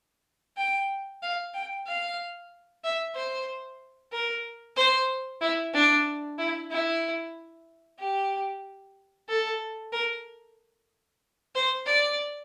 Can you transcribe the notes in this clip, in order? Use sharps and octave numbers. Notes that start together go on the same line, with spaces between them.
G5
F5
G5
F5
E5
C5
A#4
C5
E4
D4
E4
E4
G4
A4
A#4
C5
D5